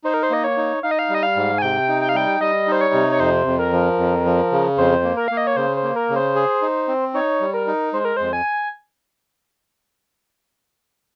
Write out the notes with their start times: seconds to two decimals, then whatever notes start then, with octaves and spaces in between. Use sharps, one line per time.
0.04 D#4 C5
0.14 A#4
0.23 C5
0.30 A#3 D#5
0.44 C#5
0.57 D#4
0.83 D#4 F5
0.91 D#5
0.99 F5
1.09 G3 D#5
1.23 F5
1.36 G#2
1.58 G#5
1.62 C3 G5
1.88 D#4
2.01 G5
2.09 F5
2.14 G3 G5
2.40 G3 D#5
2.67 D#4 C5
2.81 C#5
2.94 C3
3.12 C#5
3.20 F2 C5
3.47 F2
3.59 A#4
3.72 F3
3.98 F2
4.26 F3
4.52 C#3
4.78 F2 C5
5.04 A#3
5.17 A#4
5.28 A#3 F5
5.37 D#5
5.47 C#5
5.57 C#3 C5
5.76 C5
5.83 A#3
5.96 A#4
6.10 C#3
6.16 C5
6.35 G#4
6.62 D#4
6.88 C4
7.14 D#4 C#5
7.40 G3
7.54 A#4
7.67 D#4
7.93 G#3 C5
8.05 A#4
8.17 F2 C5
8.33 G#5